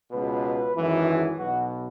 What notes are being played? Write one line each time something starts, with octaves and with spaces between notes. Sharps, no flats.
C#2 B2 B4
G#1 F#2 E3
G#4
B1 B2 F#4